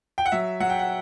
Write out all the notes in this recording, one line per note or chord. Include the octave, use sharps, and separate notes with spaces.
G5
F#5
F#3 E5
F#3 F#5
G5
F#5